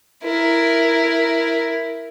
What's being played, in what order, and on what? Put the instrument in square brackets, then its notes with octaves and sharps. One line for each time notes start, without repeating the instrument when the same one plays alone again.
[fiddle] E4 A#4